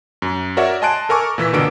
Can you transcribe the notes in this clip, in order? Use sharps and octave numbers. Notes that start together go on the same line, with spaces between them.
F#2
F#4 A#4 C#5 D5 E5 F#5
D#5 G#5 A5 C6 F#6 D7
A4 A#4 G#5 C#6 D6
A#2 E3 E6 B6
G1 B2 D3 A#3 D4 D7